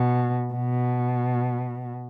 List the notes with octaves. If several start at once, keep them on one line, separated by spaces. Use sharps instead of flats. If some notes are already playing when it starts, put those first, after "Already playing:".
Already playing: B2
B2